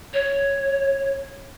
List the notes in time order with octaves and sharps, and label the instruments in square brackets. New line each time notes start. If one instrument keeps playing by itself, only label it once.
[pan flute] C#5